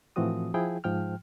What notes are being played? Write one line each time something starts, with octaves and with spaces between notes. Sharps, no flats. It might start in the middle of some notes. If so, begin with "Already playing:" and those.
A2 E3 F3 C4 F#4 D#6
F3 E4 G#4 G5
G#2 F3 G5 F6